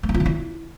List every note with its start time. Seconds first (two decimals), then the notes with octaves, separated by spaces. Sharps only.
0.03 A#3
0.09 C#4
0.14 F4
0.20 D#3
0.26 E4